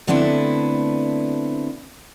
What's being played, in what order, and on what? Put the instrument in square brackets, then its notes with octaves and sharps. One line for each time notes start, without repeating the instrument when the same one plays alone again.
[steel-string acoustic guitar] D3 A3 B3 C4 D4 E4